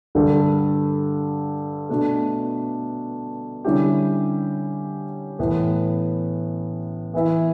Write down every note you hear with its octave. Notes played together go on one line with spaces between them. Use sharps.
G2 D3 G3 D4 A4
B2 A3 D4
D3 G3 C#4 E4 G4
A2 E3 B3
E3 B3 E4